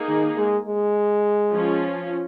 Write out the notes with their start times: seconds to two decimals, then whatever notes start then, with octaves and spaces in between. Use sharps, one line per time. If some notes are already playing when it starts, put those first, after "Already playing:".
Already playing: A#3 D#4 G#4
0.09 D#3
0.37 G#3
0.66 G#3
1.51 F3 C#4 F4